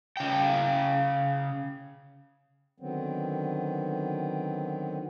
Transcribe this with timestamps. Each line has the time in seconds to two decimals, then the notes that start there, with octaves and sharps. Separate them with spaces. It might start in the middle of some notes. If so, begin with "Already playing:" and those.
0.17 C#3 G5
2.80 D3 D#3 F#3 B3 C4